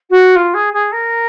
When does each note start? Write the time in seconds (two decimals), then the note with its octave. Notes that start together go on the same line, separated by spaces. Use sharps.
0.10 F#4
0.35 F4
0.54 G#4
0.73 G#4
0.92 A#4